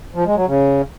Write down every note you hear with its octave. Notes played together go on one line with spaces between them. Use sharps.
F3
G#3
F#3
C#3